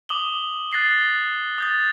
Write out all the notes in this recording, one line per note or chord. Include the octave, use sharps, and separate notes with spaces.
D6 D#6 F#7 G7
F#6 A6 A#6 C7 G7
D#6 G6 A6